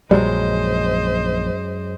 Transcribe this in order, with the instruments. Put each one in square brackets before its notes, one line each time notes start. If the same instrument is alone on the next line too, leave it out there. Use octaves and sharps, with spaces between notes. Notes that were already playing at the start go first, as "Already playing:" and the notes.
[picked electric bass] A#1 [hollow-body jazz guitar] F#2 G#3 A#5 [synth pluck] G3 [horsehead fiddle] C5 D#5